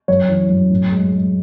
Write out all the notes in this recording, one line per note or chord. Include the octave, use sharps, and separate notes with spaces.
F#2 C#5
E3
F#2
A2
G#3
G#3